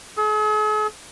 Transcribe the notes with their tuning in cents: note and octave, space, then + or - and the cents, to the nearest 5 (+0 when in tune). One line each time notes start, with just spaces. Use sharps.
G#4 +45